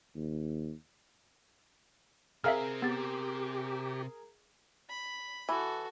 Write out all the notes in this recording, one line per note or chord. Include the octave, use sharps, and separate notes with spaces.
D#2
C3 C4 G#4 A#4 E5 F5 F6
B3 G4 A6
B5
E3 F#4 A4